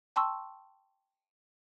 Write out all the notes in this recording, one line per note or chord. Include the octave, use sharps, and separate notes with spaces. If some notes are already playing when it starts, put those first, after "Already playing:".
G5 A5 C6 C#6 E6